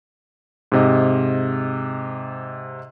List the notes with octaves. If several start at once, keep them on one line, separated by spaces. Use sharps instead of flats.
G#2 C3 D#5